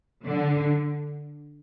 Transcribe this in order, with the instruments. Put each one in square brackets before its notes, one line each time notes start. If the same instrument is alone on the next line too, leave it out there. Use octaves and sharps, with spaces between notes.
[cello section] D3